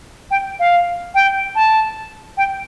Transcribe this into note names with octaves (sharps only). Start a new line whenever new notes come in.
G5
F5
G5
A5
G5